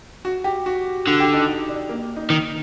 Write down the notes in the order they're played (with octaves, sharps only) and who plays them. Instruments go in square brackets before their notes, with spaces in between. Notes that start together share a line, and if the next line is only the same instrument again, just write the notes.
[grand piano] F#4
G4
F#4
[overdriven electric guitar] D3 [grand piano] F#4
[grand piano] G4
D#4
D#4
D4
A#3
D#4
[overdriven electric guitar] D#3 [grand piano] D#4